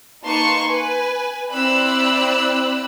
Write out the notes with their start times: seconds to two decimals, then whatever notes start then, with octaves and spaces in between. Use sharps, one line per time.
0.25 A#3 D#4 B4 A5 C6 C#6
0.68 B4 G#5
1.51 C4 E4 D5 B5 E6 F#6